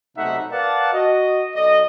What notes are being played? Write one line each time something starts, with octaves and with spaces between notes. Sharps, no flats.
B1 C3 A3 D#4 E5 F#5
A#4 B4 D5 F5 F#5 A5
F#4 D#5
B1 A4 D5 D#5